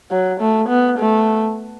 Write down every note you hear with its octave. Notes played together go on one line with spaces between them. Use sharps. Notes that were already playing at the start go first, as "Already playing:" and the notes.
F#3
A3
B3
A3